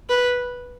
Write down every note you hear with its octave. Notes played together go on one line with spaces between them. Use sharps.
B4